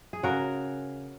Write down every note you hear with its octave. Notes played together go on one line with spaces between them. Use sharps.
G#4
C#3 F#4 A#4